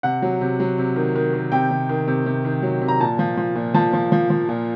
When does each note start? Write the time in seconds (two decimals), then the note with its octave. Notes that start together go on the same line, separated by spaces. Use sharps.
0.03 C3 F#5
0.22 F#3
0.41 C3
0.60 F#3
0.78 C3
0.96 D#3
1.15 D#3
1.34 D#3
1.52 C3 G5
1.71 C3
1.89 D#3
2.08 C3
2.26 C3
2.45 D#3
2.63 F#3
2.81 C3
2.88 A#5
3.00 A#2 A5
3.19 F3
3.37 F3
3.55 A#2
3.74 F3 A5
3.93 F3
4.12 F3
4.30 F3
4.49 A#2